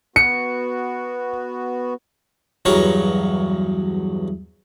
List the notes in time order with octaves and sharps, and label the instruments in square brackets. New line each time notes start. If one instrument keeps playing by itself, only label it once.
[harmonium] B3 F#4 [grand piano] C#7
[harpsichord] E2 G2 F#3 A#4 C#5